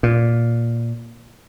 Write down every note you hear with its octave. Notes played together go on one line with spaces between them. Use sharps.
A#2